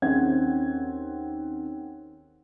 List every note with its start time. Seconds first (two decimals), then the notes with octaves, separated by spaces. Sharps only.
0.02 D#2 C4 C#4 G#4 F#5 G#6